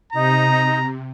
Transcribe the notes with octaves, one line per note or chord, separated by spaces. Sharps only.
C3 D#4 A#5